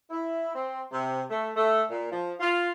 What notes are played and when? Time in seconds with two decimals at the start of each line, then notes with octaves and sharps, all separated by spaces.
0.10 E4
0.54 C4
0.92 C3
1.29 A3
1.54 A3
1.89 A#2
2.11 F3
2.40 F4